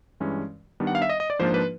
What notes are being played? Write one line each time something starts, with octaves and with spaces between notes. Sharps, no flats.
G2 E3 G#3 C#4
D#3 G3 B3 D4
F#5
F5
E5
D#5
D#5
D5
G#2 F3 A#3 D4 F4 C5
B4